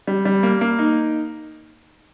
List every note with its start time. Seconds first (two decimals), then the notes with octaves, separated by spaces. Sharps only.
0.07 G3
0.25 G3
0.43 A#3
0.61 A#3
0.79 D#4